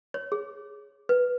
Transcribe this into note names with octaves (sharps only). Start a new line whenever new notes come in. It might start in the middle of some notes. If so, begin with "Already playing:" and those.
C#5
G#4
B4